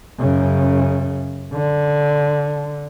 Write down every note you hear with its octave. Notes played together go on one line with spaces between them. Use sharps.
F#2 C#3
D3